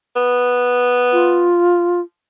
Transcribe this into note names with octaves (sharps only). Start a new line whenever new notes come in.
B3
F4